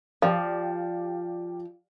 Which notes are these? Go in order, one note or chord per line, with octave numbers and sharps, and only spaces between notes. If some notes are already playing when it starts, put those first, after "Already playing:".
F3 G4 D5 F5